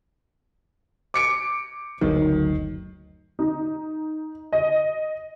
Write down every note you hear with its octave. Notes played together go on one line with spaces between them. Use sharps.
D6 C#7 D7
F#1 D2 D#3 F#3
D#4
D#5